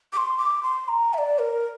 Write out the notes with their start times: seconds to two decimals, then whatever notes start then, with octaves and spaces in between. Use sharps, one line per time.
0.12 D6
0.17 C6
0.38 D6
0.63 C6
0.88 A#5
1.13 E5
1.18 D5
1.39 A#4